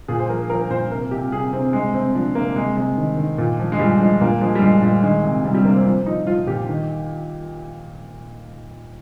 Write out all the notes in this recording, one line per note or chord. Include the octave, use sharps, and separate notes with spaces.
A#2 G#4
C5
F3 A#4
F3 A#4
A#2 C5
C3 A#4
C3 G4
C3 G#4
C3 C4
C3 G#3
C3 C4
F3 D4
C3 A#3
C3 G#3
C3 G#3
D#3
D#3
A#2
F3
G#3
A#2 G3
F3 G#3
A#2 A#3
F3 G#3
G3
A#2 G#3
A#2 G#3
D#3 G#3
C3
C3 G3
G3
C3 A#3
C4
F3 C4
F3 D#4
F3 F4
A#2 G4
D#3